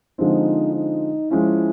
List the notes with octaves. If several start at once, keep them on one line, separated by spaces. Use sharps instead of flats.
D3 F3 G#3 C4 D#4
D#4
F3 G#3 C#4 E4 F4